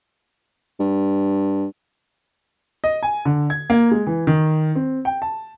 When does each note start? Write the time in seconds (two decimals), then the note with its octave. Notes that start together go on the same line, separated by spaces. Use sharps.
0.80 G2
2.84 D#5
3.03 G#5
3.25 D3
3.50 G#6
3.70 A#3
3.91 G#3
4.07 E3
4.27 D#3
4.75 C4
5.05 G5
5.22 A5